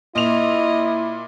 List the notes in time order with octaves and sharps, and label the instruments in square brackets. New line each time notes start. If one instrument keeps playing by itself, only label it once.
[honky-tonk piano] A#2 F7 [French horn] E4 [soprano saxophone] D#5